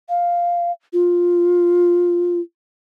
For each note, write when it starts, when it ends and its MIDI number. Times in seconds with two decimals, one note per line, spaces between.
0.09 0.72 77
0.93 2.40 65